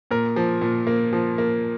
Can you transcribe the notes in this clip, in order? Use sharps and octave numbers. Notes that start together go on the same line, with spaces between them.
A#2 A#4
F3
A#2
A#3
F3
A#3